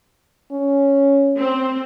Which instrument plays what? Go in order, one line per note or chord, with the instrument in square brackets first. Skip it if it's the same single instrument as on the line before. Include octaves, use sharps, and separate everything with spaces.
[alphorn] C#4
[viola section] C4